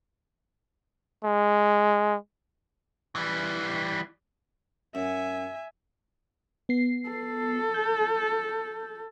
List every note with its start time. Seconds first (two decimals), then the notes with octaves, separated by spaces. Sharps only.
1.24 G#3
3.15 E3 G3
4.95 F#2 E5 G#5
6.69 B3 C7
7.09 A4
7.74 G6